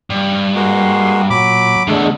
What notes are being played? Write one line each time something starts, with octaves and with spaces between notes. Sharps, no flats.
G2
G#3 A#3 F#4 C6
A#2 F#3 B5 D6
E2 D3 G#3 A3 D4